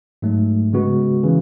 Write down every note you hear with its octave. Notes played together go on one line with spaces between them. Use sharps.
G#2 F#3 A3
C#3 G#3 B3 F#4
C#3 E3